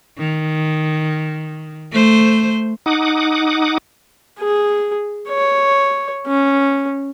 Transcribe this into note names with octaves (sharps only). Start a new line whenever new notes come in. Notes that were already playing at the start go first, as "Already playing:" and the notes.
D#3
A3 C5
D#4 F#5 D6 D#6
G#4
C#5
C#4